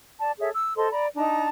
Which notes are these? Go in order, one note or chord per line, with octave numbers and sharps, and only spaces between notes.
D5 A5
G#4 A4 C#5 E5
E6
A4 C5 D#5 C6
D5 A#5 B5
D4 D#4 A5 A#5